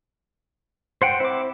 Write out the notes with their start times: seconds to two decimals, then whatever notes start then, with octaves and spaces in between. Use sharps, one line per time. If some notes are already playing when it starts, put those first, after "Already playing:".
1.02 C5 F#5 G5
1.20 C4 E4 D6